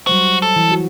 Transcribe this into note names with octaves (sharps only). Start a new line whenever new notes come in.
F#3 G3 F#4 C5
A4
E3
F#4